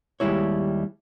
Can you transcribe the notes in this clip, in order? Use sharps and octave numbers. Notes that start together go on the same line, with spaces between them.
D#2 G3 G#3 E4 C#5